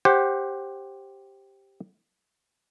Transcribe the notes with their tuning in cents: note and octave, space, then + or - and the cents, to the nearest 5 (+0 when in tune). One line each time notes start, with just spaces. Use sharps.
G4 +0 C5 +20 F#5 +0